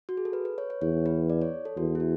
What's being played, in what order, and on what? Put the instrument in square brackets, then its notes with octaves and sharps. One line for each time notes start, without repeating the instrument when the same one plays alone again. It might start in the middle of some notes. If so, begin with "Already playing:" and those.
[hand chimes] F#4
G#4
A4
B4
B4
C#5
C#5
[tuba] E2 [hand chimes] C#5
[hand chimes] B4
D5
C#5
A4
[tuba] E2 [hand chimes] F#4
[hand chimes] E4
F#4